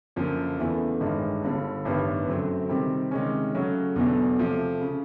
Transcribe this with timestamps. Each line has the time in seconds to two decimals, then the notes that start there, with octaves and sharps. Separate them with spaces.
0.16 F#2 D3 F3 A#3
0.58 E2 C#3 E3 A3
1.00 A1 G2 D#3 G#3
1.42 G1 G2 D3
1.85 A1 G2 D#3 G3 B3
2.27 F#2 D3 F#3 A3 C4
2.69 C3 D#3 G3 C4
3.11 C3 D#3 G#3 C#4
3.54 C#3 F#3 A3 C#4 F#4
3.96 E2 B2 F#3 A3 D4
4.39 C3 F3 A3
4.81 C#3